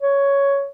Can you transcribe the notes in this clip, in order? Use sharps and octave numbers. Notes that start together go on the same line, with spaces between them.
C#5